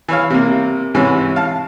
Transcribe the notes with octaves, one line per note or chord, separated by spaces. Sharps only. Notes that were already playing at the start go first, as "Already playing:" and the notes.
E3 C#5 F5
C3 A#3
G#2 C3 E3 C#4
F5 A5